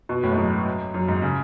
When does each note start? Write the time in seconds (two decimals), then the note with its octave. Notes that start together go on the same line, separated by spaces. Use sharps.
0.09 B2
0.23 A2
0.32 G#2
0.38 F#2
0.94 F#2
1.08 G#2
1.22 C#3